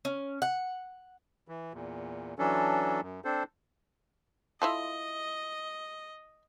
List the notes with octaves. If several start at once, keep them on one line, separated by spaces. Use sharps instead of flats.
C#4
F#5
E3
E2 A#2
E3 F#3 C#4 D4 A4
F#2
C4 D4 A4 C5
E4 F4 A4 D#5